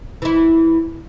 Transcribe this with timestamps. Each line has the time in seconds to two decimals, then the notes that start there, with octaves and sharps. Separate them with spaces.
0.22 E3 E4